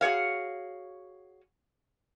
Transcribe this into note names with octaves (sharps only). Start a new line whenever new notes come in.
F#4 G#4 C#5 F5